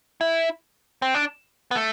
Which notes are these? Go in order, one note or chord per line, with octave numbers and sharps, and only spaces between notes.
E4
C4
D4
B3
A3